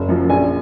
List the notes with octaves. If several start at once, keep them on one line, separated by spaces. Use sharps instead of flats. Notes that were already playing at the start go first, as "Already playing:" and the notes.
Already playing: F#1
F#2 F3
A#1 G#5